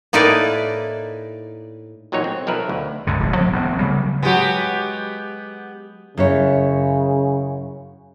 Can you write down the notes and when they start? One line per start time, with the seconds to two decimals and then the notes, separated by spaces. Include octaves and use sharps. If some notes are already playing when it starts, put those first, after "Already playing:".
0.13 A2 A#3 D#4 E4 B4 D5
2.12 A1 A#2 F#3 D#4 C#5
2.24 C4
2.47 B1 F3 A#4 B4 E5
2.69 D2
3.07 C#2 G2 D3
3.20 D1 A#1
3.37 F3 F#3 A#3 C4
3.53 A1 B3 C4
3.79 C#3 F#3 G3
4.22 F#3 G#3 B3 G4
6.17 F#2 C#3 E4 C#5